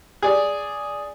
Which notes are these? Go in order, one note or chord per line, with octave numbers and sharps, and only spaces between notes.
G#4 D5